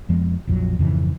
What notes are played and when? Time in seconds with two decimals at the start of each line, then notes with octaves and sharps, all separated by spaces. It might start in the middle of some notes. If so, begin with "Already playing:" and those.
0.09 F2 F3 G#3 B3
0.47 A#1 F2 D#3 F#3
0.79 F2 G#2 C#3 E3